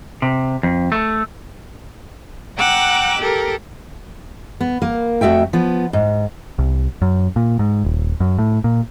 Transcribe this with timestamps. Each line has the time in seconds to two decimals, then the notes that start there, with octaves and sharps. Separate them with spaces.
0.22 C3
0.63 F2
0.92 A3
2.57 F#5 G5 A#5 D6 E6 F#6
3.18 G4 A4 A#4
4.61 B3
4.82 A#3
5.21 F2 A3 F#4 E5 G5
5.53 F3 B3
5.93 G#2
6.58 C2
7.02 F#2
7.36 A#2
7.59 G#2
7.84 D#1
8.20 F#2
8.39 A2
8.64 A#2